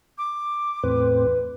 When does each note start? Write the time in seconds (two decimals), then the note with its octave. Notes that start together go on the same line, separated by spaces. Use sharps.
0.18 D6
0.83 E2 A2 C4 B4